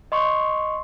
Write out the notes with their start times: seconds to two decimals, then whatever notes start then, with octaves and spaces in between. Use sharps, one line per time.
0.12 D#5 C6 C#6